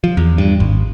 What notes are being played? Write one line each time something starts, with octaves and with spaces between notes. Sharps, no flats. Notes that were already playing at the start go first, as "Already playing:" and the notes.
F3
E2
G2
G#1